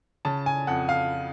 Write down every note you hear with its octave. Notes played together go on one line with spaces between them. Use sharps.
C#3 A5
G#5
F2 F#5
F5